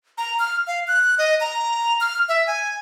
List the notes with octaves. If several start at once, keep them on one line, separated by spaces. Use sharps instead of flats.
A#5
F6
F5
F#6
D#5
A#5
F6
E5
G#5